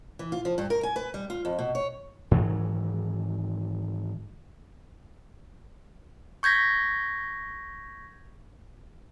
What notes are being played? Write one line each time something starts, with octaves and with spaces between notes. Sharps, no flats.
E3
F4
F3
G2
A#4
G#5
B4
G3
F4
F2
B2
C#5
G#2 D#3 E3 F#3
C#6 G6 G#6 A#6 B6